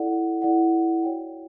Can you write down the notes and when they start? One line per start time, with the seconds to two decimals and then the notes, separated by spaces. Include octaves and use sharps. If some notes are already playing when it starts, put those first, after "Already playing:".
Already playing: E4 A4 D5 F#5
0.42 E4 A4 D5 F#5
1.03 F#4 C#5 G5